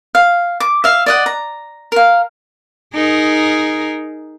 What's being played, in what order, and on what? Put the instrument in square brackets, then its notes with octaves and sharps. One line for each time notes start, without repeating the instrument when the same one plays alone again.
[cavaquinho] F5
D6
E5 F5
D5 D#5 F#5
A#5
A#4 F5
[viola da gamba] D#4 G#4 A#4